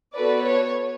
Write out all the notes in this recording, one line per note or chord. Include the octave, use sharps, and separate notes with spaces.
B3 F#4 A4 B4 D5
C#5